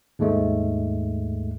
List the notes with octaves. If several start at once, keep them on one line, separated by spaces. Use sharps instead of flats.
D#2 G#2 G#3 A3